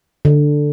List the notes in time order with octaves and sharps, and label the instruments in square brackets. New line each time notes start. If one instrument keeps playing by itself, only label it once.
[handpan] D3